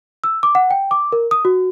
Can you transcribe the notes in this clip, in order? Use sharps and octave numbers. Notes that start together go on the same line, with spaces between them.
E6
D6
F#5
G5
D6
A#4
D#6
F#4